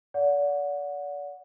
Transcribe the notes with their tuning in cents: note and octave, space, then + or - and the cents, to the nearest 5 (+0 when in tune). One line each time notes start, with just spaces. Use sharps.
D5 -35 F#5 -20